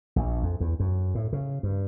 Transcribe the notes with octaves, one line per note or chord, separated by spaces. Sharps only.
A#1
F2
E2
F#2
A2
C#3
G2